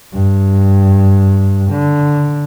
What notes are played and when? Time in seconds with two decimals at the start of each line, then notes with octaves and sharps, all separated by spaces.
0.13 G2
1.72 D3